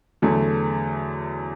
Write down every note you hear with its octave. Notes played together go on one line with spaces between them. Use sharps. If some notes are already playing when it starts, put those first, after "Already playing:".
E2 D3 F#3 A3